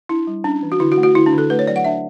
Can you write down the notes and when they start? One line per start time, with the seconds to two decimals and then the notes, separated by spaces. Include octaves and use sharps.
0.09 D4 E4
0.27 G3
0.44 C#4 D4
0.63 E3
0.72 F#4
0.80 D3 E4
0.92 F#4
0.98 A3
1.03 F#4
1.15 D3 E4
1.26 D4
1.32 D3
1.38 A4
1.50 A3 B4
1.59 C#5
1.67 F#3 D5
1.76 F#5
1.84 D4 E5